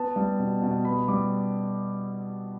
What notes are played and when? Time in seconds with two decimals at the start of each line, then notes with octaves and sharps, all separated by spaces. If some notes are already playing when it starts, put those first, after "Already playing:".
Already playing: B3 A5
0.16 G3
0.39 B2
0.62 B2
0.85 B3 B5
1.08 G3 D6